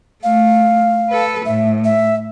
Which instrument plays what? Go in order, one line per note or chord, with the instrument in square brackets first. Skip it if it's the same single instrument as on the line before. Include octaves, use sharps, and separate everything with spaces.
[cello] A3 [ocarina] F5
[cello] A4 B4
[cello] A2 [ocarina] E5
[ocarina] E5